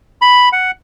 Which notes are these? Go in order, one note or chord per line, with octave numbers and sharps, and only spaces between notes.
B5
F#5